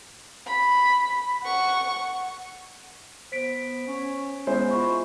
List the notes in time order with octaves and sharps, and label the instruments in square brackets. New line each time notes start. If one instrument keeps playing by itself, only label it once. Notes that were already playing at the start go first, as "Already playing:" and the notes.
[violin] B5
F#5 C#6
[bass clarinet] B3 [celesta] C5 B6 D7
[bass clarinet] C#4
[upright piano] G#3 E4 C5 [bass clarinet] B3
[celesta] F4 B5 C#6